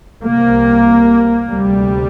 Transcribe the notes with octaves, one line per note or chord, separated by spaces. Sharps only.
C2 C3 A#3
D2 C3 G3